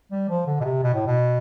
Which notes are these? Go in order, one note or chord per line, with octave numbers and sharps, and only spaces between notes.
G3
F3
D3
B2
C3
B2
A2
B2